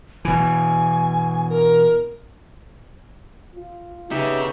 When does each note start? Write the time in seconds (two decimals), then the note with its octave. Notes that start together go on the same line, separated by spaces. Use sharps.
0.25 B2 E3 G#5
1.49 A#4
3.55 F4
4.11 C#3 B3 D#4 G4 E5